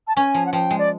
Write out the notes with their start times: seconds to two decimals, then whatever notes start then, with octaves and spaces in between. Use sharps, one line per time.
0.08 A5
0.16 C#4 G#5
0.34 F3
0.46 F#5
0.53 F3 G5
0.71 G#3
0.79 D5